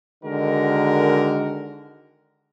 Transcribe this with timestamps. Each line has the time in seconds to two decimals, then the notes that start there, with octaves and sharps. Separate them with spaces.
0.24 D3 D#3 G#3 F#4 A#4